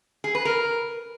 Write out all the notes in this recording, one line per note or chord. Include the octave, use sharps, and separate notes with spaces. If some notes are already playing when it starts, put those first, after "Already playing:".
G#4
B4
A#4